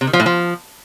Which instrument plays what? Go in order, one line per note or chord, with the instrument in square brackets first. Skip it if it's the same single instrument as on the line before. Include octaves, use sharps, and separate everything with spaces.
[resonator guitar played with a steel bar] C3
D#3
F3
A2
F3